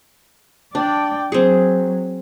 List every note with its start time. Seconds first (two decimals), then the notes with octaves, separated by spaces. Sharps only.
0.75 D4 D5 G5
1.32 F#3 C4 G#4